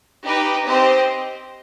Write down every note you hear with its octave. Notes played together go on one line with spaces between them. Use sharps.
D#4 G4 B4
C4 G4 C5 D#5